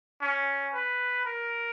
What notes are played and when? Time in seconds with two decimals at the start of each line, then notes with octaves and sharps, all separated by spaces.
0.21 C#4
0.74 B4
1.25 A#4